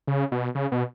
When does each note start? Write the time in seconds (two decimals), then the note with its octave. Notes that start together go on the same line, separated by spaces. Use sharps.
0.07 C#3
0.32 B2
0.55 C#3
0.72 B2